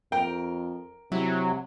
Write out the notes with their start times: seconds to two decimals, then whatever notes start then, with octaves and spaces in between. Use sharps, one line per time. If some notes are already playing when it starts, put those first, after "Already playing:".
0.12 F2 A#4 G5
1.12 C3 F#3 E4